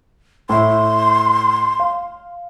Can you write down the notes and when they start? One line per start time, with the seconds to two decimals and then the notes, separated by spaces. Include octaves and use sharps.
0.49 A2 E4 C6
1.80 F5